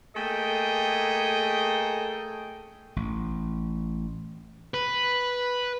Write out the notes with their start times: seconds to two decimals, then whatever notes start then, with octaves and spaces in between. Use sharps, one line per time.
0.15 A3 A#3 G#4 A4 D#5 G5
2.96 A1
4.74 B4